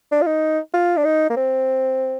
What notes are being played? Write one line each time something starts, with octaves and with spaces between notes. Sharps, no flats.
D4
F4
D#4
F4
D4
D#4
A#3
C4